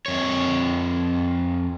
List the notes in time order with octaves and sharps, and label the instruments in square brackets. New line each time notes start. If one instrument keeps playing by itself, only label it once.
[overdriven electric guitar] F2 C#5